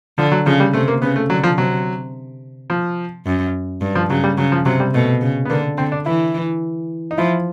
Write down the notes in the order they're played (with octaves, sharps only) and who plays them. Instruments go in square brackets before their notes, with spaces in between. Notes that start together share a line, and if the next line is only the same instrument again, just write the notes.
[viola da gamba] D3 [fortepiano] F3
[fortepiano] F#3
[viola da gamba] C#3 [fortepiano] F3
[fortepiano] G3
[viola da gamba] C3 [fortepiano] A3
[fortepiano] A#3
[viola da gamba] C#3 [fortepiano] B3
[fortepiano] A3
[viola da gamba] D3 [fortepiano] F#3
[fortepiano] F3
[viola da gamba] C3 [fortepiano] F#3
[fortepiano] F3
[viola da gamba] F#2
G2
[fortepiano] F3
[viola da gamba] C#3 [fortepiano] F#3
[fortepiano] G3
[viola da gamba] C#3 [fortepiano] F#3
[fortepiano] F3
[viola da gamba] C3 [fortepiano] F#3
[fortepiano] G3
[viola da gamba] B2 [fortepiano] A3
[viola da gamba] C#3
[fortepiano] B3
[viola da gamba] D3 [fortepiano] A#3
[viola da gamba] D3 [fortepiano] C4
[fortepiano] D4
[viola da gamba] E3 [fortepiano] E4
[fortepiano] D#4
[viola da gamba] F3 [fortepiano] E4